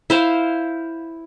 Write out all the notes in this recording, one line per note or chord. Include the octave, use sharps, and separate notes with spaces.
E4 C5 F5